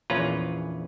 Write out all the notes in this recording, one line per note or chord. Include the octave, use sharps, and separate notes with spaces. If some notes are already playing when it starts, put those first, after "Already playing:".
A#1 E2 C#4 F4 B4 A#5